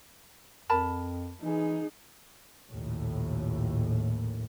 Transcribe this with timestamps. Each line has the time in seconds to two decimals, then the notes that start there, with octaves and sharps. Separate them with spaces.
0.69 F2 A#4 A5 B5
1.42 E3 D#4 G#4
2.69 A#1 D#2 A2